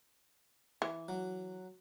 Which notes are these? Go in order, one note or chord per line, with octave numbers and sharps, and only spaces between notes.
E3
F#3